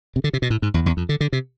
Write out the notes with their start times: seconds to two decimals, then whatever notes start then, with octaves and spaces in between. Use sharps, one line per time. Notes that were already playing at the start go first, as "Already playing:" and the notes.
0.16 C3
0.24 D3
0.33 C3
0.42 B2
0.50 A2
0.62 G#2
0.74 E2
0.86 E2
0.97 F2
1.09 D3
1.21 D3
1.33 C3